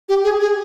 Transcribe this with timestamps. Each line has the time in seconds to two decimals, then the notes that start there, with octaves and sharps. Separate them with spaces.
0.09 G4
0.24 G#4
0.41 G#4